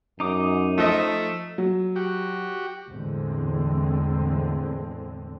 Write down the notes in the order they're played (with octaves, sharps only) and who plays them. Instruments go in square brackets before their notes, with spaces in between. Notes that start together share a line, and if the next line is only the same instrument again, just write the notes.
[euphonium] F#2 [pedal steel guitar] D#4 D6 D#6
[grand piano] F3 D#5 [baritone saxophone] A3
[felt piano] F#3
[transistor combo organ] F#4 G4
[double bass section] E2 A2 D3 G#3 C4